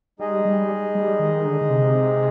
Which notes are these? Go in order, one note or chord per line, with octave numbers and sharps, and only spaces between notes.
G3 G#3 D#4 G#4 D#5
G3
G3
D#3
D3
D3
C3